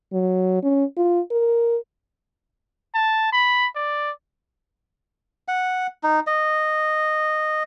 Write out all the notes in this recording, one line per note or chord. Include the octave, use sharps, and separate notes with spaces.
F#3
C#4
F4
A#4
A5
B5
D5
F#5
D#4
D#5